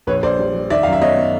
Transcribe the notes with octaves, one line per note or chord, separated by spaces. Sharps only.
A#1 B4 C#5
A#1 C5 D5
G3
G3
D#3 D5 E5
F#2 F5
E5
B3 C#5 D#5
B3